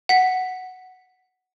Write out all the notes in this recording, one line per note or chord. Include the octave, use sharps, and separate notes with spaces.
F#5 B6